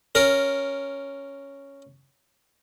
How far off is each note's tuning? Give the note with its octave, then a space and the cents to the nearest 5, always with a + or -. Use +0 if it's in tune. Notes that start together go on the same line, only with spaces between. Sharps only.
C#4 +0 A#4 +0